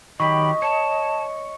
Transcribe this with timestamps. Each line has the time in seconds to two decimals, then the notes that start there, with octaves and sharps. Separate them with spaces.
0.20 D#3 F#3 G4 D#5 B5 C#6
0.62 C#5 A5